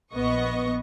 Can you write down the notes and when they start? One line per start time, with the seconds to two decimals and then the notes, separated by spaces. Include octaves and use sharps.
0.13 A#1 B3 D#5 C#6